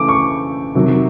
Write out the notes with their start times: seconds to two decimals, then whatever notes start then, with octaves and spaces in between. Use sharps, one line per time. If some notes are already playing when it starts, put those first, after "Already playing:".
Already playing: C#3 E3 A3 D6
0.09 C#6
0.75 C3 D#3 F#3